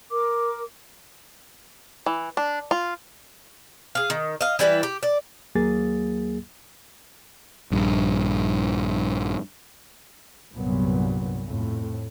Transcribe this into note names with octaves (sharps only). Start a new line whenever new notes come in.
A#4 D6
E3
D4
F4
G#4 F5
D#3
D#5 F5
E3 G3 E4 B4
G4
D5
D#2 F#3 A#3 G#4 A6
A#1 G2
C2 G2 A#2 F#3 B3
F2 A2